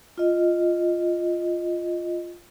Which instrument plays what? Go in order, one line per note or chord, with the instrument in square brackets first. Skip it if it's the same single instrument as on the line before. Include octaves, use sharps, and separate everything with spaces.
[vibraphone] F4 D#5